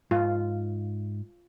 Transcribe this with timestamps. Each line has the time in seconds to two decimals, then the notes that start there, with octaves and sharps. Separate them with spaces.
0.11 G#2 F4